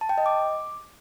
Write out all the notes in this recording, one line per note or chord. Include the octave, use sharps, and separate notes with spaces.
A5
G5
D#5
D6